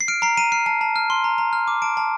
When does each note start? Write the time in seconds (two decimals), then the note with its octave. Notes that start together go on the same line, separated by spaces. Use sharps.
0.01 C7
0.08 F6 D7
0.22 A#5 C7
0.37 A#5 D#7
0.52 F6 C7
0.66 A5 C7
0.81 A5
0.96 F6
1.10 C6
1.24 A#5
1.38 A#5
1.53 F6
1.68 D6
1.82 A5 D7
1.97 A5